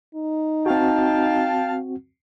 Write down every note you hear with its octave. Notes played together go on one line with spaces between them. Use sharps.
D#4
C4 F#4 F5 G5 A5